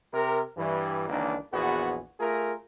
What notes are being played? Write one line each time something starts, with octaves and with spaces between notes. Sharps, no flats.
C3 A#4
G2 E3
C#2 D#3 E3 A#3 D4
A#1 E2 B3 F#4 G#4
A3 F4 G#4 A#4